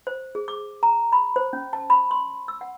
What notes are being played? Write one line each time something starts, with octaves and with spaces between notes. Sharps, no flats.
C5
G#4
D6
A#5
B5
C5
C#4
A5
B5
C6
E6
F#5